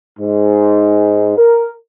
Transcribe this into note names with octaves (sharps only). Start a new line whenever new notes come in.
G#2
A#4